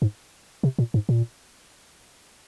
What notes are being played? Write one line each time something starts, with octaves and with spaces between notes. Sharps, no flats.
G#2
C3
A#2
G#2
A#2